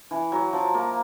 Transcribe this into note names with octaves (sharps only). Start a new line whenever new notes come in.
E3
F#3
F3
A#3